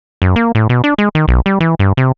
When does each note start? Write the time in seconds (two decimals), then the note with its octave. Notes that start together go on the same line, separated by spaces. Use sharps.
0.22 F#2
0.36 A#3
0.55 A2
0.69 B2
0.84 D4
0.98 G#3
1.15 D#3
1.28 B1
1.46 G3
1.60 E3
1.79 G2
1.97 C3